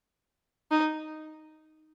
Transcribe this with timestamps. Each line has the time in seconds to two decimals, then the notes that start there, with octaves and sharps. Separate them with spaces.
0.71 D#4